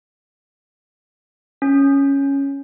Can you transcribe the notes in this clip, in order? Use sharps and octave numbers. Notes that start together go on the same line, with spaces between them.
C#4